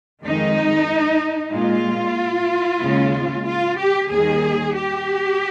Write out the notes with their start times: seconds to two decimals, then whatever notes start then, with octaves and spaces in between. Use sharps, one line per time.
0.24 F2 D#3 G#3 D#4
1.53 A#2 G#3 F4
2.82 D#2 C#3 G#3
3.46 F4
3.78 G4
4.10 D#2 D#3 G3 G#4
4.75 G4